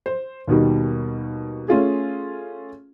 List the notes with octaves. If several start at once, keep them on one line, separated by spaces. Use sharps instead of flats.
C5
D#2 B2 D#3 G3
A3 C#4 F4 G#4